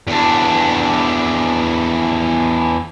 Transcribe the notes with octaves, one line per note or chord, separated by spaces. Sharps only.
E2 D4